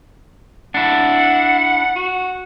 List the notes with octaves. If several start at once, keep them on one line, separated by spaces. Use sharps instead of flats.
D4 E4 F#5
F#4